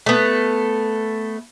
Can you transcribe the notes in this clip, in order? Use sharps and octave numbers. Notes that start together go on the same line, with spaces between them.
A3 B3